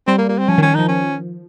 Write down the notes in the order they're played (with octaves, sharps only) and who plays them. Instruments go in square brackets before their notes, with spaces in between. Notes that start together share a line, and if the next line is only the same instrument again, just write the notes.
[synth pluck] G3 [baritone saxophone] C4
[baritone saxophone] A#3
A#3
C4
[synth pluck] F3 [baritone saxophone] C#4
[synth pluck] D#3
[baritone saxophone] C#4
[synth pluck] D#3
[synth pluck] F3 [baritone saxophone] D#4
[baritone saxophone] C#4